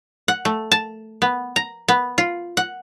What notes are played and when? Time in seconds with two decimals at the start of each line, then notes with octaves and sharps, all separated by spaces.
0.28 F#5
0.45 A3
0.72 A5
1.22 B3
1.56 A#5
1.88 B3
2.18 F4
2.57 F#5